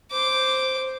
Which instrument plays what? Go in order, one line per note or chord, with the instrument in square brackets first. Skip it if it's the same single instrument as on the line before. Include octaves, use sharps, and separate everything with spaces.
[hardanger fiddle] C5 D6